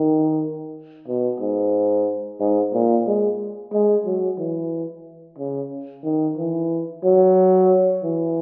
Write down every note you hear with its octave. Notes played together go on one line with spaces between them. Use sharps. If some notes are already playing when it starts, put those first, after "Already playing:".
Already playing: D#3
B2
G#2
G#2
A#2
G#3
G#3
F#3
E3
C#3
D#3
E3
F#3
E3